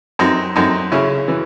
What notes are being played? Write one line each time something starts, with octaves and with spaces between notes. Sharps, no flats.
F#2 C4 D#4
F#2 C4 D#4
C#3 C#4 E4
E3